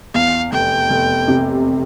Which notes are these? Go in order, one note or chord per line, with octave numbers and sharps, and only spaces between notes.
E2 F5
F1 G5
F1
C3